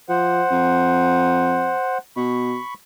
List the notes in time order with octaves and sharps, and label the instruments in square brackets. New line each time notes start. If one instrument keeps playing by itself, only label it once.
[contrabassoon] F3 [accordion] C5 F#5
[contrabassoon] F2
[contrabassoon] B2 [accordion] B5 C#6